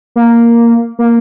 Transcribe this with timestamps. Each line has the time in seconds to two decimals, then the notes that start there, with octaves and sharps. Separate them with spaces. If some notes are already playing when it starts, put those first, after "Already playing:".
0.16 A#3
0.99 A#3